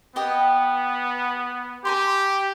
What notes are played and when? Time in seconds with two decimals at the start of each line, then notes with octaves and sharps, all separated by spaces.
0.16 B3 G4 D#5 G5
1.85 G4 G#5 A#5 C6